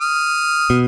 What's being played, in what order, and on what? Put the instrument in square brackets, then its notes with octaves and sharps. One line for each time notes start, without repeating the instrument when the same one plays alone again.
[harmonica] D#6 F6
[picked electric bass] B2